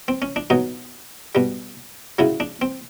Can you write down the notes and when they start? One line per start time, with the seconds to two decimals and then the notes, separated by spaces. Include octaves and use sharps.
0.08 C4
0.22 C#4
0.36 D4
0.50 B2 F#3 D#4
1.35 B2 G3
2.19 C#3 F#3 E4
2.40 D4
2.62 C4